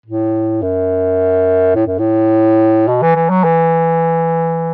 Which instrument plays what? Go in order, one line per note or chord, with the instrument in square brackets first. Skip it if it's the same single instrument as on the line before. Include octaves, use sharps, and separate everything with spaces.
[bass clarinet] A2
F#2
A2
F#2
A2
B2
E3
E3
F#3
E3